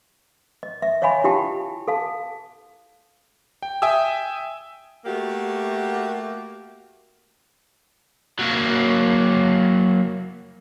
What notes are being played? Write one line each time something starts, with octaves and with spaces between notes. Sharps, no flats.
D#5
E5
C#5 D#5 F5 G#5 B5
E4 F4 G4 F5 G5 A5
A4 F5 A5
G5
E5 G5 G#5 D#6 E6
A3 A#3 F#4 G4
F#3 A#3